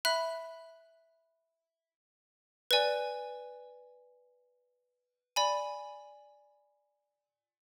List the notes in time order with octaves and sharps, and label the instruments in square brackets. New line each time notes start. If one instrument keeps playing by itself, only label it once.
[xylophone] E5 B5 F#6
B4 D5 G#5
D5 G#5 B5